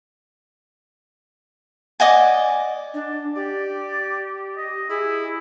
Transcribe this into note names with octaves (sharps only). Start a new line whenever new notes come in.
D5 D#5 F#5 G#5
D4
G4 D5
D#5
E4 G#4